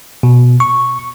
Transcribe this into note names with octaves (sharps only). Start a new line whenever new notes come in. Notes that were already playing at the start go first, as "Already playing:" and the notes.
B2
C#6